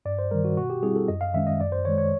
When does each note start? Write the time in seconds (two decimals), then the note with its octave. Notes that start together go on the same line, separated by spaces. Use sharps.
0.05 G2 D5
0.19 C5
0.31 D#3 G3 A#4
0.44 F#4
0.57 B2 F#4
0.70 G4
0.83 G3 C4 E4 G#4
0.96 A4
1.08 F#2 D#5
1.21 F5
1.34 D#3 G#3 C#4 E5
1.47 D#5
1.60 F#2 D5
1.72 C5
1.85 D#3 G#3 C#5
1.98 C#5